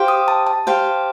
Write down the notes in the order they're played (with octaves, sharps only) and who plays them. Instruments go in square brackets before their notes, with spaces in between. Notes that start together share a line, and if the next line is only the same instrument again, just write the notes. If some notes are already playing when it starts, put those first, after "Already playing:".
Already playing: [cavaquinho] G4 C5 F5
[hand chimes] D#6
A5
A5
[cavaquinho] G4 C5 F5